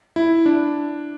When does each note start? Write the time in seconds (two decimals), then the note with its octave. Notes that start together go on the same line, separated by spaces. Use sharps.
0.16 E4
0.46 D4